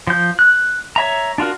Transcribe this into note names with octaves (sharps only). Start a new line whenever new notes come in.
F3 G6
F#6
C#5 E5 A#5
D4 F4 F#4 A#4